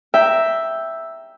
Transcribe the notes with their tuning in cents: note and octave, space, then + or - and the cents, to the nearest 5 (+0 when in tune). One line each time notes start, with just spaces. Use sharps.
E5 +0 G5 +0 A#5 +0